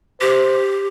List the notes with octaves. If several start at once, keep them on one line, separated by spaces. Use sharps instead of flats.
G4 C5